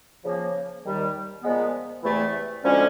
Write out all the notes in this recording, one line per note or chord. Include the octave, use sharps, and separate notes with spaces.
C#3 F3 A#3
D#2 D#3 G3
A#2 F3 G#3 B3
E2 C3 E3 A3
D2 D3 F3 G#3 C#4